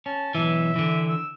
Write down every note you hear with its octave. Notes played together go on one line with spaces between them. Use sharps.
C#4 A5
B1 E3 E5
D3 E3
E6